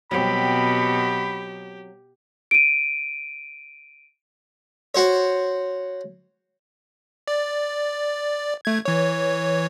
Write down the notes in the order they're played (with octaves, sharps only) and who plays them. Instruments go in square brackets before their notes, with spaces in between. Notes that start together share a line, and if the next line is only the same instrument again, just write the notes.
[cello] B2 [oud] F#3 C4 [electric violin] G4 [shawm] B5
[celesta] D7 D#7
[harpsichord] F#4 C5 C#5
[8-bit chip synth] D5
A3 G#6
E3 C#5